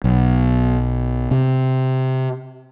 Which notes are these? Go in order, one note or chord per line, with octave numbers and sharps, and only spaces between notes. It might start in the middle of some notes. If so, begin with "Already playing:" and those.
B1
C3